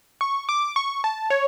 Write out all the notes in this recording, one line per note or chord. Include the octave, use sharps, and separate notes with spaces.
C#6
D6
C#6
A5
C#5